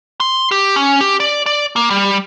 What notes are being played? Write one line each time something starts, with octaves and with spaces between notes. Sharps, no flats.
C6
G4
C#4
G4
D5
D5
A#3
G3